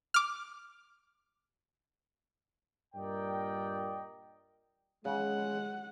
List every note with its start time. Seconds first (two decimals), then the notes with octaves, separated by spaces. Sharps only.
0.14 D6 F6
2.95 G2 A#2 A#4 D5 D#5 G5
5.05 C#3 G#3 F#5